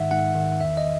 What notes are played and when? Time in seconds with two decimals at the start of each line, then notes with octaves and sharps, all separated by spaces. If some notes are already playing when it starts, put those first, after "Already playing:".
Already playing: G#2 D#3 E5 F#5
0.11 G#2 F#5
0.35 D#3
0.60 E2 E5
0.77 D#5